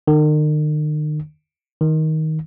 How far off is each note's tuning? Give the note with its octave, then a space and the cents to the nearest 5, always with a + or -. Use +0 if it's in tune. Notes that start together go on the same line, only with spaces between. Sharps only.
D#3 -40
D#3 +15